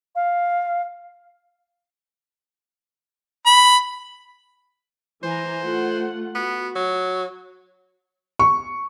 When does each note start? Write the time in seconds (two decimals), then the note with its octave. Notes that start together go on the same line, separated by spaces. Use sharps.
0.16 F5
3.47 B5
5.23 E3 C5 G#5 A#5
5.63 A3 F4 F#5
6.35 B3 F#4
6.75 F#3
8.39 C#6